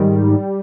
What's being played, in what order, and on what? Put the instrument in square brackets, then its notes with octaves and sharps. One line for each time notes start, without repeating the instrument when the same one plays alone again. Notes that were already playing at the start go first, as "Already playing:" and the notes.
Already playing: [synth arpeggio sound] G#2 D#3 G3